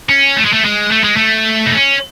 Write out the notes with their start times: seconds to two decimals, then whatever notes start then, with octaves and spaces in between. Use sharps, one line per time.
0.09 C#4
0.36 A3
0.45 G#3
0.53 A3
0.65 G#3
0.91 A3
1.04 G#3
1.17 A3
1.66 D#4
1.73 C#4